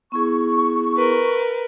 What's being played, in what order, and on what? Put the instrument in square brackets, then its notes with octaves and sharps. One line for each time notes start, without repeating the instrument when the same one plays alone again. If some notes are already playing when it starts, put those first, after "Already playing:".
[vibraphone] B3 E4 G#4 [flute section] C#6
[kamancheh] A#4 B4